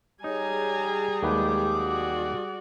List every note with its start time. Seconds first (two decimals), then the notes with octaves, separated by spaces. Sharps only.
0.24 G3 D#4 G#4 C#5 G#5 A#5
1.23 D#2 F#3 G#3 G4 B4 D6
1.76 F#4 D5